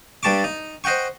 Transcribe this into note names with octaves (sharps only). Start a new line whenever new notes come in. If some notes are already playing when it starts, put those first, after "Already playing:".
G2 G3 A5 C#6 D6
D#4
C5 D#5 F#5 G5 C#6